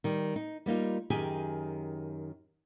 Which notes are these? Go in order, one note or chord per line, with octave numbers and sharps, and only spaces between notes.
D#3 G3
D#4
G3 A#3 D#4 F4
F#2 D#3 G4 G#4 G#5